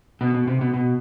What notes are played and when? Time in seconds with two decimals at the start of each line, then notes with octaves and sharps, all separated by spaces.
0.21 B2
0.35 B2
0.48 C3
0.61 B2
0.74 B2